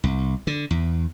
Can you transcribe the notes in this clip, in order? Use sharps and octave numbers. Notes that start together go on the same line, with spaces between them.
C2
D3
E2